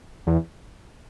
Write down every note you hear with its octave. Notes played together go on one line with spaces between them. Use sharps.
E2